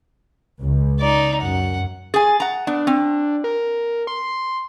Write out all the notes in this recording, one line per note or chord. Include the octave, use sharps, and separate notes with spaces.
C#2
D#4 D5
F#2 F#5
G#4 G#5 A6
F#5 A#5
B3 D4
C4
A#4
C6